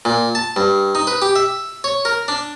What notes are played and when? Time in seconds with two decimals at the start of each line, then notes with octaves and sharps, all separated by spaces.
0.05 A#2
0.35 A5
0.56 G2
0.95 D#4
1.07 B4
1.22 G4
1.36 E5
1.84 C#5
2.05 A#4
2.28 D4